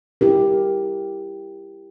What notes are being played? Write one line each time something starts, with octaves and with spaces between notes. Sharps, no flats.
E4 G4 A#4